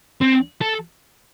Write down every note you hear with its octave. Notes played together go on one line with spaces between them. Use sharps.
C4
A4